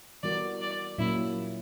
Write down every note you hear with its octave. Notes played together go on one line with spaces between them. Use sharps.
E3 G3 B3 F#4 A#4 D5
D5
A#2 F#3 A#3 C#4 E4